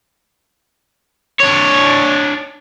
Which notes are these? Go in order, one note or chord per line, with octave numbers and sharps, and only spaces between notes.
D4 C#5